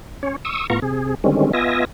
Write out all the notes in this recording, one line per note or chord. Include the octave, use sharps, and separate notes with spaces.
C#4 C#5
C#6 D#6 E6
A2 B3 F4 A#5 C#6
C3 G#4
D3 D#3 G3 G#3 C4 C#4
B3 F4 D#5 E5 G#5 A#6